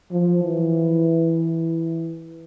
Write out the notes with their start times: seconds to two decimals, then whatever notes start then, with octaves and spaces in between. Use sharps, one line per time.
0.12 F3
0.43 E3